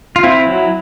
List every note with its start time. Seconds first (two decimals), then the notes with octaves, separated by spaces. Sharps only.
0.16 F4
0.24 C4 E4
0.47 F#3